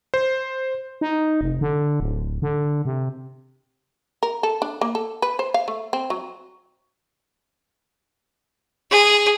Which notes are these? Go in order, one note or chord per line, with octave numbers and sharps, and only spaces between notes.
C5
D#4
F1
D3
D1
D3
C3
A#4
A4
D4
A#3
A4
B4
C5
F5
A3
C4
F#3
G#4